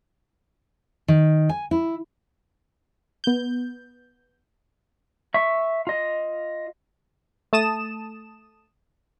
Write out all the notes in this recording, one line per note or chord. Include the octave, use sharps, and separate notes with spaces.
D#3
G#5
E4
B3 G6
E5 C#6
F4 D#5
A3 A5 D#6 E7